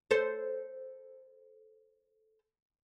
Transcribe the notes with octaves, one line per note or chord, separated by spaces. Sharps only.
A4 C5